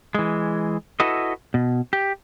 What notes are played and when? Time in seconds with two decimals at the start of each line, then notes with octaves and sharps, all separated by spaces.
0.15 E3 G#3
1.00 E4 F#4 A4 B4 D#5
1.54 B2
1.93 G4